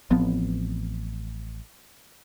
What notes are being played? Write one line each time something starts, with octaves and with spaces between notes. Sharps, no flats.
A1 F3 B3 C4